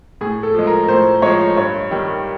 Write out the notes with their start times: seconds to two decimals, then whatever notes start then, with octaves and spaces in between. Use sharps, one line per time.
0.21 A2 G#4
0.43 A4
0.54 F3 G#3
0.67 A#4
0.88 A2 C5
1.22 F3 G#3 C#5
1.56 G2 C#5
1.91 D#3 G3